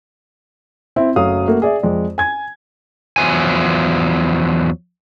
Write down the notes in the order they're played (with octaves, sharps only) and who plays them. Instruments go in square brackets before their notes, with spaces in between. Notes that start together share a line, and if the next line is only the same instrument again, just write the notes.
[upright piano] C4 E4
F#1 F#3 A3 F5 D#6
A3 A#3 F#4
G#4 D5 E5
F2 G#3 D5
G#5 G#6
[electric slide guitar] E2 G#2 F3 F#3 G#5